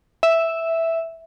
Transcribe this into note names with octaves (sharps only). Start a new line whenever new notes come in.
E5